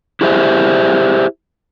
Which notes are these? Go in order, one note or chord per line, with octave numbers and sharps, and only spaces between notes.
E4 G4 G#4 C5 E5